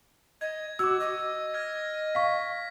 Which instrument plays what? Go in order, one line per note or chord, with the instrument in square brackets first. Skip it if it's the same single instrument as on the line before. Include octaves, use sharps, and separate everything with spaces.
[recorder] D#5 [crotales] G#6
[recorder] F#4 [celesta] D6 E6 [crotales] G#6
[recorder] D#5
[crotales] F6 G#6 A#6
[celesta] F5 C#6 [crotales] B6